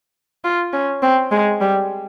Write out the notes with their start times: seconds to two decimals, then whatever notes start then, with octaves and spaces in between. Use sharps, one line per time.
0.45 F4
0.73 C#4
1.03 C4
1.32 G#3
1.61 G3